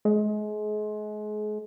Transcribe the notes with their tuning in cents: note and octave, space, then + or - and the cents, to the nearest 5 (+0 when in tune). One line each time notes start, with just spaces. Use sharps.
G#3 +30